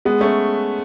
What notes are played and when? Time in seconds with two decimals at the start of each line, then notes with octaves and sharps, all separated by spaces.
0.05 G#3 B3
0.21 A3 C#4